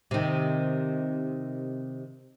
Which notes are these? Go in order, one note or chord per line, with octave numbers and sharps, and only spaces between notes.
C3 D#3